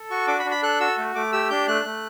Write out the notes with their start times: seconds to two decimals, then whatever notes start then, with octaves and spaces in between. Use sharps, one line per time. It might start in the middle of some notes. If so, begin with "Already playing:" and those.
Already playing: A4
0.10 F#4 C#6
0.27 D4 D6
0.39 B5
0.45 D4
0.50 B5
0.63 A4 F#6
0.80 F#4 E6
0.98 A3
1.15 A3 D6
1.32 G4 E6
1.50 D4 G6
1.68 A3 F#6
1.85 A3